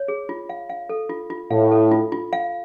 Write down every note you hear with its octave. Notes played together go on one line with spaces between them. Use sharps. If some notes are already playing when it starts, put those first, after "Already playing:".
Already playing: C#5
G#4
F4
F5
F5
A4
F4
F4
A2 F5
A4
F4
F4
F5